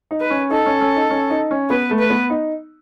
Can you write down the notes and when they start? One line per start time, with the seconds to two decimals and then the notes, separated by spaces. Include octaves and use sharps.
0.11 D#4
0.21 B4
0.30 C#4
0.51 D#4 A4
0.66 C#4
0.81 C#4
0.96 D#4
1.10 C#4
1.30 D#4
1.51 C#4
1.70 B3 B4
1.91 A3
1.99 B4
2.10 B3
2.30 D#4